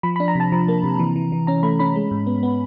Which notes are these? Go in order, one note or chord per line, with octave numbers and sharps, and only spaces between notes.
F3 B5
B5
D4
A#5
C3 A5
F3 A#5
A#3
C3
E3
E3
E3
C#4 A#5
A3 B5
C#4 B5
G#3
G#2
B3
B3